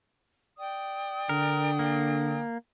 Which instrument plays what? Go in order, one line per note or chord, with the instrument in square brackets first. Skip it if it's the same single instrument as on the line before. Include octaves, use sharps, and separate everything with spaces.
[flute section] D5 G5 D#6
[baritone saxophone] D3 [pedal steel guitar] A#4
[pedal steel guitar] A#3